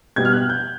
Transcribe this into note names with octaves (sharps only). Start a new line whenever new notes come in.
B2 G3 B3 G#6
F6
F#6
G6